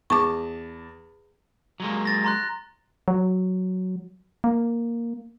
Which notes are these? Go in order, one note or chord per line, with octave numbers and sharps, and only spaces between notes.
E2 A5 C#6 D6
F#3 G#3 A#3
A6 A#6
A#5 C6 F#6
F#3
A#3